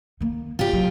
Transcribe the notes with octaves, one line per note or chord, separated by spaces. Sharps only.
D#3 A#3
C#3 F4 G4
F#3